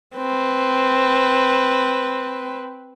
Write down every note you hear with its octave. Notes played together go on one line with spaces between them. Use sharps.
C4 B4